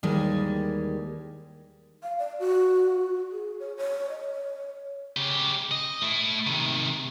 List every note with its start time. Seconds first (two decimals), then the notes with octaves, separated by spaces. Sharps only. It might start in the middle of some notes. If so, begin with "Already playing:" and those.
0.03 D#2 D#3 E3 G3 G#3
2.03 F5
2.19 D5
2.40 F#4
3.32 G#4
3.60 C#5
3.77 C#5
4.10 D#5
4.32 C#5
5.17 C#3 G4
5.71 D#5
6.02 A3 E4
6.47 C3 D#3